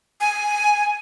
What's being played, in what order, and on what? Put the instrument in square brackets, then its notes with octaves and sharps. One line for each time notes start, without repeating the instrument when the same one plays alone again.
[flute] G#5